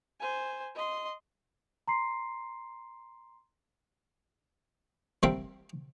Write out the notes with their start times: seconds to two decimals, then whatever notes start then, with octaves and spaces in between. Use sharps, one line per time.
0.20 C5 G#5
0.75 D#5 C6
1.88 A#5 C6 C7
5.23 G3 A#3 C4 A#4 E5